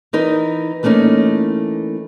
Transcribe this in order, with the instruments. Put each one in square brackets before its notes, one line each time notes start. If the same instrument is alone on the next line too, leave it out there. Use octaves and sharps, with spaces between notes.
[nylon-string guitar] E3 D#4 A#4
E3 A3 A#3 C#4 D#4